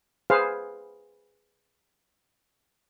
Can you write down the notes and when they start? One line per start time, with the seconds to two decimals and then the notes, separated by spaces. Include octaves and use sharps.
0.30 G#4 B4 C5 F5